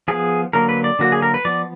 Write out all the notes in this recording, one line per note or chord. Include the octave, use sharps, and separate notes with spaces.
F3 B3 G#4
D3 F#3 A#3 A#4
B4
D5
D3 F#3 A#3 F#4
G#4
A#4
B4
F3 B3 D5